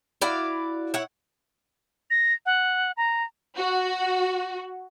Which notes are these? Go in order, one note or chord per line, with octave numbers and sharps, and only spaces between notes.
E4 F#4 D5 F5
E4 C#5 F#5
A#6
F#5
A#5
F#4